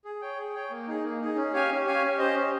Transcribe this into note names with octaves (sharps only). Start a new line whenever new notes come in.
G#4
C#5 G5
G#4
C#5 G5
A#3
D#4 G#4
A#3
D#4 G#4
C#4
G4 C#5 F5 G#5
C#4
G4 C#5 F5 G#5
C#4
G4 C5 D#5
C#4